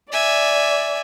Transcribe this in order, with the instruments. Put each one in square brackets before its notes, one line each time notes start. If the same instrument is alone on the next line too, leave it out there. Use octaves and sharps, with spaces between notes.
[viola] D5 [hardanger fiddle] E5 G#5